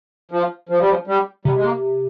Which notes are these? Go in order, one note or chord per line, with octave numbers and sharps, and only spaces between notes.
F3
F3
G3
F3
G3
C3 G3
G#3
A#3